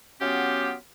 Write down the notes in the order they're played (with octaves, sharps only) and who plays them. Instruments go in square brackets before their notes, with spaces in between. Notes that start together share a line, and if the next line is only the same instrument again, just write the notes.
[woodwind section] F#3 B3 C#4 F4 G4